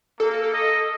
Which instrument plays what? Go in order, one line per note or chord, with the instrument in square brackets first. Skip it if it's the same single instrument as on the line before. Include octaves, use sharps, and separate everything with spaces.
[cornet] A#3 [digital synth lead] A4
[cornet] D#5